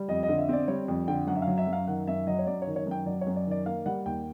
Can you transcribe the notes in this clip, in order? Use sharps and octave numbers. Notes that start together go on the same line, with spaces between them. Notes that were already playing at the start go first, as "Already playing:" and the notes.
Already playing: G3
F2 D#5
D#5
D3
E5
C4 D5
G3 C#5
F2
D3 G5
F#2 F#5
E5
F5
F#3
E5
F#2
F5
D#3 F#5
F#2 E5
F#3 D#5
C#5
F#2 D5
D#3 C#5
C#5
F#2 G5
F#3 D5
C#5
F#2
D5
D#3
D5
A#3 F5
G3 F#5
D#2 G5